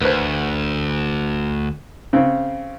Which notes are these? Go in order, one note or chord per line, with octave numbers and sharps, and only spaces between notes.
D2 B4 C5
C#3 C4